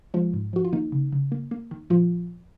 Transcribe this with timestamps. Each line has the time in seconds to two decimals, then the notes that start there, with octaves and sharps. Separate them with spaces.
0.14 F3 G#3 F4
0.34 G#2
0.53 F3 F#4
0.65 F4
0.73 D#3 A#3 D#4
0.92 C#3
1.12 C#3
1.32 A#3
1.51 A#3
1.71 D#3
1.90 A#2 F3 F4